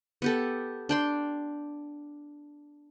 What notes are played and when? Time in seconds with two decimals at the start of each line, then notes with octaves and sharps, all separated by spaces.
0.22 B3 G4 A4
0.89 D4 G5 C6